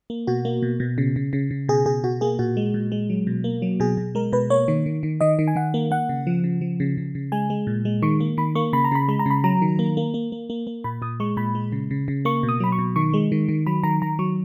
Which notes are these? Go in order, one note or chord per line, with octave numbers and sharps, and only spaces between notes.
A#3
B2 F#4
A#3
B2
B2
C#3
C#3
C#3
C#3
B2 G#4
B2 G#4
B2 F#4
A#3 G#4
A#2 F#4
G#3
A#2
G#3
F#3
B2
A#3
F#3
B2 G#4
B2
G#3 A#4
B2 B4
A#3 C#5
D#3
D#3
D#3
D#3 D#5
D#3
G#5
D#3 F#5
A#3
A#3 F#5
C#3
F3
C#3
F3
C#3
C#3
C#3
G#3 G#5
G#3
A#2
G#3
D#3 C#6
A#3
D#3 B5
A#3 C#6
C#3 B5
A#5
C#3 B5
G#3 B5
A#5
C#3 B5
F#3 A#5
D#3
A#3
A#3
A#3
A#3
A#3
A#3
A#2 B5
A#2 D#6
G#3 C#6
A#2 B5
G#3
C#3
C#3
C#3
A#3 C#6
B2
D#6
F#3 B5
C#6
B2
D#3 C#6
G#3
D#3
D#3
F#3 B5
D#3 A#5
D#3 A#5
F#3 C#6